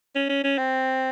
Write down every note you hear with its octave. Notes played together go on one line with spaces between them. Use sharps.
C#4
C#4
C#4
C4